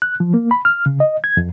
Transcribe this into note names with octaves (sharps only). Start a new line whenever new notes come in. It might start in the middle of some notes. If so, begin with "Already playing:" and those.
F#6
F3
A#3
B5
F6
C#3
D#5
G#6
F2